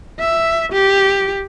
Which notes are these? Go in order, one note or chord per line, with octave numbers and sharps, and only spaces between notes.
E5
G4